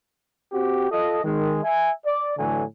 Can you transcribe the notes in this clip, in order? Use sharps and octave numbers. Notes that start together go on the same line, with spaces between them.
C4 F#4 G4
F4 A4 D#5
D#3 G#3
E5 G#5
D5
A2 D3 E3 F#3 G#5